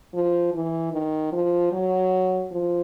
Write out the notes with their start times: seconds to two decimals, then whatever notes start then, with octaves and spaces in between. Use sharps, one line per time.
0.14 F3
0.54 E3
0.93 D#3
1.33 F3
1.72 F#3
2.52 F3